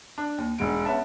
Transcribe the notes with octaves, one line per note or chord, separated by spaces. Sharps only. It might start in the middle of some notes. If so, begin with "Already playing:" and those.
D4
D#2
E1 G#2 D7
B3 C#4 E5 A5